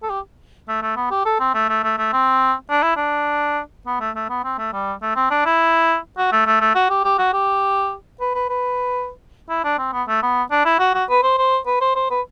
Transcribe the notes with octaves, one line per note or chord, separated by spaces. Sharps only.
A4
G4
A3
A3
B3
G4
A4
C4
A3
A3
A3
A3
C4
D4
E4
D4
B3
A3
A3
B3
C4
A3
G3
A3
C4
D4
E4
F#4
A3
A3
A3
F#4
G4
G4
F#4
G4
B4
B4
B4
E4
D4
C4
B3
A3
B3
D4
E4
F#4
F#4
B4
C5
C5
B4
C5
C5
B4